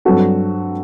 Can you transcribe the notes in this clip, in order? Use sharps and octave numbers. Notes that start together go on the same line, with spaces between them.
G2 F#3 C4 F#4 A4